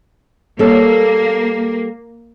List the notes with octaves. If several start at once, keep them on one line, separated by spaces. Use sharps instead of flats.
G3 A#3 A4 C#5